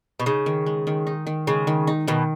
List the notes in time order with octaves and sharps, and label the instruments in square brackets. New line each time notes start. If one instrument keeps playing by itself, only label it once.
[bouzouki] B2
[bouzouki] C#3 [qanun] D#4
[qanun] D#3
G#3
D#3
D#4
D#3
[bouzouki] C#3 [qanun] G#3
[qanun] D#3
D#4
[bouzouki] B2 [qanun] D#3